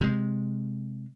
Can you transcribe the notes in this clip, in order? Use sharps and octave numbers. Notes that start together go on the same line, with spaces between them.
C3 G#3